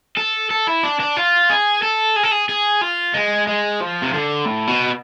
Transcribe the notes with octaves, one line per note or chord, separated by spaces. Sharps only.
A4
A4
E4
D4
D4
F4
G#4
A4
G#4
A4
G#4
G#4
F4
G#3
G#3
F3
C3
D3
A2
B2